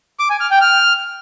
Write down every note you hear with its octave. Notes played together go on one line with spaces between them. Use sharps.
D6
G#5
F6
G5
F6